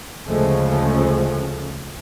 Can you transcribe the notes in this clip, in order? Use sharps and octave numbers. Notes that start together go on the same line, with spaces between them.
D2 C#3 F3 G#3 A3 C#4